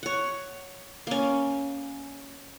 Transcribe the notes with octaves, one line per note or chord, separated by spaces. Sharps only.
C#5 F#5
A#3 C#4